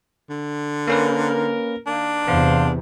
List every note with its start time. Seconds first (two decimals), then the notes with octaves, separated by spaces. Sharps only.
0.30 D3
0.87 A#3 C#4 A#4 B4
1.86 D#3 A#3 D4
2.28 E2 C3 B3 C5 F5